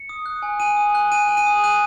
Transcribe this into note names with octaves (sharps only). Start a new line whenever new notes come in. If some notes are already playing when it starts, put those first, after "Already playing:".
Already playing: C#7
D#6
F#6
G#5
G#5 D#7
D#6
F#6
G#5 D#7
G#5
D#7
D#6
F#6 D#7